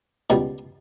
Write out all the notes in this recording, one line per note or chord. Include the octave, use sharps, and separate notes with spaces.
C#2 B2 G3